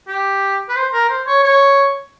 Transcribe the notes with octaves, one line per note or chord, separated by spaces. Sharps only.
G4
B4
C5
A#4
C5
C#5
C#5